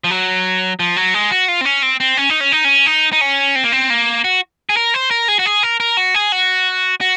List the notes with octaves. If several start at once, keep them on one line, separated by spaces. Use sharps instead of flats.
F3
F#3
F3
F#3
G#3
F#4
F4
C4
C#4
C4
C4
C#4
D#4
C#4
D#4
C#4
D#4
D#4
C#4
C4
A#3
C4
A#3
F#4
G#4
A#4
C5
A#4
G#4
F#4
G#4
A#4
A#4
F#4
G#4
F#4
F#4